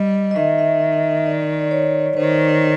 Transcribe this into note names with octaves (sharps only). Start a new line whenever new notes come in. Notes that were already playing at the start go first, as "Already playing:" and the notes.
Already playing: G3 D#5
D#5
D#3 E5
E5
D#5
D#5
D5
D5
C#5
D#3 C5